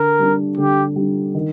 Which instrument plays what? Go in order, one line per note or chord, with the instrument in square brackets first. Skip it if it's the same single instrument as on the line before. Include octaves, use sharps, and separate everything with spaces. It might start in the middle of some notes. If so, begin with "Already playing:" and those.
Already playing: [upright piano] D3 [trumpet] A#4
[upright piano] G3 D4
[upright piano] D3 [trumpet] G4
[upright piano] G3 D4
D#3